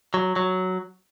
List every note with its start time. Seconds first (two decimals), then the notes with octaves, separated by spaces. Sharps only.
0.14 F#3
0.36 F#3